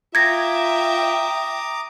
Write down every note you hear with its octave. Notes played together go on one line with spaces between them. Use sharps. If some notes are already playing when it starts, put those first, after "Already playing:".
F4 E5 G5 A#5 D6 D#6 G#6 A#6